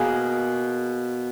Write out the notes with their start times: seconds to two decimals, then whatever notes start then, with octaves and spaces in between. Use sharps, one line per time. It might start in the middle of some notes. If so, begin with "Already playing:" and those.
Already playing: B2 A#3 G#4 A#4